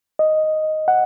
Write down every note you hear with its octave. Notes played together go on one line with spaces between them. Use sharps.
D#5
F#5